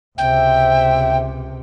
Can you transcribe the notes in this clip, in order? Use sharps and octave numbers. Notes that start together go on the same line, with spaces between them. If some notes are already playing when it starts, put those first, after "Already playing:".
C#2 C3 C5 E5 G5